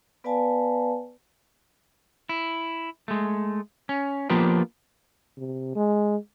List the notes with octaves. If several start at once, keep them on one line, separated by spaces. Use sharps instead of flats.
B3 B4 D5 F5 G#5 A5
E4
G#3 A3
C#4
F3 A#3 B3 D4 F4 G4
C3
G#3